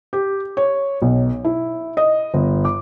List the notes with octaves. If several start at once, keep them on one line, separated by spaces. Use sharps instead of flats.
G4
C#5
B1
E4
D#5
G1
D6